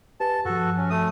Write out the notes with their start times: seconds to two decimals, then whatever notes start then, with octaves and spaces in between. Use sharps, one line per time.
0.20 G4 B4 G#5 A5
0.45 G2 F3 F#4 A4
0.77 C#4
0.90 A3 D#6